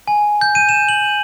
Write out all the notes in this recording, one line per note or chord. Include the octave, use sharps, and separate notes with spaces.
G#5
G6
D#7
E7
F#7